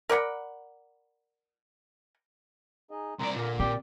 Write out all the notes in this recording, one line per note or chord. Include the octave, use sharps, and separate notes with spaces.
A#4 D5 F#5 B5
D#4 G#4 D#5
C2 A#2 D5 A#5 C6
A#2 D3 A#3
C4 G4 D5 D6